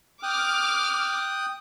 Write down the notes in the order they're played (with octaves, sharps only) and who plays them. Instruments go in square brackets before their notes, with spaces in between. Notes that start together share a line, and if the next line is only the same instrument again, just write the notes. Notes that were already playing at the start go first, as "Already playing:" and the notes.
[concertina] G5 D#6 F#6 [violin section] D6 F6